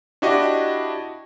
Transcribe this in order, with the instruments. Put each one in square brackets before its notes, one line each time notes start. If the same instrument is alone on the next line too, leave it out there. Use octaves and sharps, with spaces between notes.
[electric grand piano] D4 E4 F#4 G4 D#5